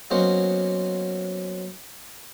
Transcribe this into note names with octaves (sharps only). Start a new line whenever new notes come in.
F#3 A#3 B3 C#4 C5 D#5